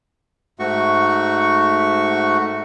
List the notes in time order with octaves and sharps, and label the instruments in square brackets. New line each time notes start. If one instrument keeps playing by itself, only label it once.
[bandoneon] G#2 A3 F#4 C#6